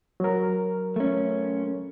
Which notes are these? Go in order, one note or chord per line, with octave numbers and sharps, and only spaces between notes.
F#3 A#4
A3 C#4